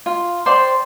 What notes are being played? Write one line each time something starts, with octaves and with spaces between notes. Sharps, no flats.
F4
C5 D5 G5 C6